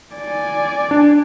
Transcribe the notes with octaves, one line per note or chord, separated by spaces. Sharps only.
D5 G#5
D4